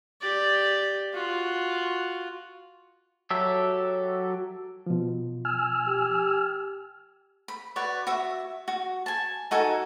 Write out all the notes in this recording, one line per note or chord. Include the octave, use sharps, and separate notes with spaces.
G4 D5
F4 F#4
F#3 G4 A4 E5
B2 F3
G#5 E6 F6
G4
B5
F#4 B4 C#5 D5
F#4 E5
F#4
G#5 A5
D#4 F#4 A4 G#5